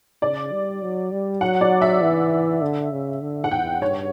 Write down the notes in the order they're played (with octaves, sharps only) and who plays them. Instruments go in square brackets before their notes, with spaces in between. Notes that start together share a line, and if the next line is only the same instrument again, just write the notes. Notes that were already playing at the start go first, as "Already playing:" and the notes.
[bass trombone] C#3 [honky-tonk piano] D5
[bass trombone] G3
F#3
G3
[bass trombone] F#3 [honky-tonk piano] F#5
[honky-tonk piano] D5
E5
[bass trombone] E3
D3
C#3
D3
[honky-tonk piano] F#5
[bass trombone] E2 [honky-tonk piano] G5
[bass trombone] G2 [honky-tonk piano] C#5